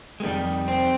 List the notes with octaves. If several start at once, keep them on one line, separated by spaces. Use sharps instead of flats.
G#3
F2 D#3 G3 A#3
C4